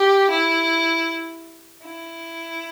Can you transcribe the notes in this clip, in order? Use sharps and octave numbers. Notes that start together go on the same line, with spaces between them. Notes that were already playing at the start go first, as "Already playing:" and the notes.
Already playing: G4
E4
E4